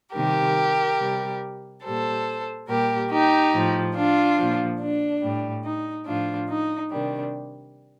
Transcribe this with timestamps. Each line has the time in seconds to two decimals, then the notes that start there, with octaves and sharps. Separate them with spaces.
0.14 C3 D#3 G3 G4 A#4
0.99 C3 G3
1.83 A#2 G3 A4 C5
2.68 A#2 G3 G4 A#4
3.10 D#4 G4
3.53 A2 F3
3.95 D4 F4
4.38 A#2 F3
4.79 D4
5.22 A2 G3
5.64 D#4
6.06 A2 F3 D4 F4
6.49 D#4
6.91 C3 D#3 G3 D4